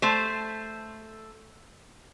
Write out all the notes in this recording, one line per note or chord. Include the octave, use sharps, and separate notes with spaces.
A3 C5